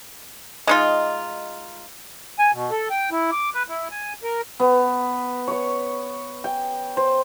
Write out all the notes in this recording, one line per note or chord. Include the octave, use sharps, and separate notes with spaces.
G#3 D#4 F4
G#5
B2
A4
G5
E4
D6
B4
E4
G#5
A#4
B3
C#5 C#6
G5
C5